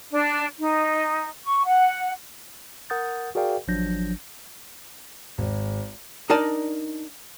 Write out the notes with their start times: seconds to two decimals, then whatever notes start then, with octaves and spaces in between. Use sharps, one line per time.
0.11 D4
0.58 D#4
1.45 C#6
1.65 F#5
2.90 A#4 F#5 D#6 G6 A6
3.35 F#4 G#4 A#4 D5 F5 G5
3.68 G#1 F3 F#3 D4 G6 A#6
5.38 G#1
6.30 D4 D#4 A#4 D5 G#5 A5